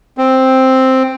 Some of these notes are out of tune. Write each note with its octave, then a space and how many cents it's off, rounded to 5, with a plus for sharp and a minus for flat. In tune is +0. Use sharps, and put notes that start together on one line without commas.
C4 +0